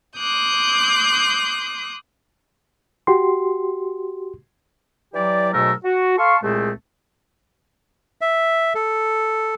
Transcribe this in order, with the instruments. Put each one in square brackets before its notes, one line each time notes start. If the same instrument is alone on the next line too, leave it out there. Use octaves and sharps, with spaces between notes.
[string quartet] C6 D6 D#6 F#6 G6
[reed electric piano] F#4 G4 C6
[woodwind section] E3 F#3 E4 G4 D5
G#2 B2 F#3 A3 A#4 E6
F#4
A4 F5 A5 C6 C#6
C2 A#2 G#3 A3 C4 G#4
[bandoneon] E5
A4